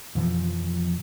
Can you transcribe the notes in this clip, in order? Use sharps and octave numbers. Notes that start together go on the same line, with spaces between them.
F2 B2 E3 F3